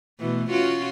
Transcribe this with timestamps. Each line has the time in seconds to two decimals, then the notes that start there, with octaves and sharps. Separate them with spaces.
0.19 B2 E3 A3
0.51 C#4 F4 F#4